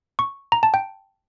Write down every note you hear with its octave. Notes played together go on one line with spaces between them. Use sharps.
C#6
A#5
A5
G5